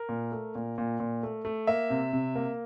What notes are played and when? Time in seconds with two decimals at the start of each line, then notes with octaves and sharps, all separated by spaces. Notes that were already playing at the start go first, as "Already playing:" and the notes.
Already playing: A#4
0.09 A#2
0.32 A3
0.55 A#2
0.78 A#2
1.00 A#2
1.23 A3
1.45 A3
1.67 A#3 E5
1.90 C3
2.13 C3
2.35 A#3